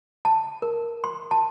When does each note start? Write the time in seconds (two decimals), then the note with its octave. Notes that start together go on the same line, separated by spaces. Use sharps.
0.25 A5
0.62 A#4
1.04 C6
1.31 A5